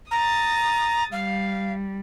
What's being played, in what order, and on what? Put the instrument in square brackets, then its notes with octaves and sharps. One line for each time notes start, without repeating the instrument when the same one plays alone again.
[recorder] A#5 [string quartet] D#6 A6
[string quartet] G3 [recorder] F5